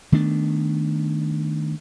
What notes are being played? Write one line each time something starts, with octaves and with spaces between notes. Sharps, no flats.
D#3 A3 B3 D4